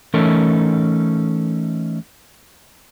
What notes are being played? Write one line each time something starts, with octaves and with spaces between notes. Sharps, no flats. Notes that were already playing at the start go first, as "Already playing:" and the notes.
E3 A3 C#4 D#4 A4 A#4